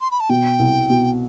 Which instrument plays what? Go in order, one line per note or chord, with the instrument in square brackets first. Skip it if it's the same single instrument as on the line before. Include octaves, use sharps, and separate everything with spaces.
[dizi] C6
B5
A5
[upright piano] B2 [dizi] G5
[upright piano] C2
B2